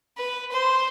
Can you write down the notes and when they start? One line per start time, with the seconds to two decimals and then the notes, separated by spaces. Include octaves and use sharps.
0.17 B4
0.52 C5